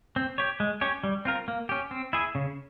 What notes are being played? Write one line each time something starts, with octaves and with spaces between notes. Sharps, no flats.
C4
G4 C#5
G#3
C#4 G4 C#5
G3
C4 F4 A#4
A#3
C#4 G4
C4
E4 G#4
C#3